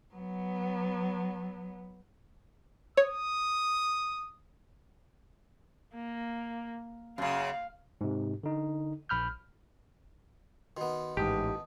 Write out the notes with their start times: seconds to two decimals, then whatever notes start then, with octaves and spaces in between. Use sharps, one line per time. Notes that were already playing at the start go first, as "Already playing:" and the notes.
0.14 F#3 B3
2.97 C#5 D#6
5.95 A#3
7.18 F#2 C#3 F5
8.01 G#2 C3
8.43 D3 D#4
9.09 A#1 B5 F6 G6
10.77 D#3 B3 F#4 C6
11.17 A1 G#2 G4 A5 D#6